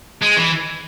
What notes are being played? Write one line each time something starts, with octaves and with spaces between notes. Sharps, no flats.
G#3
E3